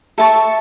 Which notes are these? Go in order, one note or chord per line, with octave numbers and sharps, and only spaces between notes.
A4 E5 A5 C#6